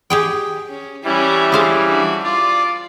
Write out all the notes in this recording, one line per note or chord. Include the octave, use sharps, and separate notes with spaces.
G4 G#4 G5
C#4
E3 G3 C#4 E4
G#4 C5 F5
D4 F#4
F4 D5